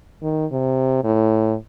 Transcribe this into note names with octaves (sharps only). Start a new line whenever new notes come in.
D#3
C3
A2